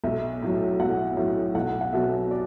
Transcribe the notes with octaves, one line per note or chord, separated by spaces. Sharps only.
B1 E5
A2 F#3
B1 F#5
A2 F#3
B1 F#5
F#5
B2 F#3 E5
D5